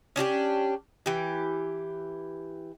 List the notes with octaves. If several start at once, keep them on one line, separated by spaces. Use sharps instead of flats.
C#4 D4 F#4 G4
E3 G4